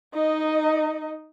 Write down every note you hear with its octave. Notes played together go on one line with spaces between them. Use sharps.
D#4 D#5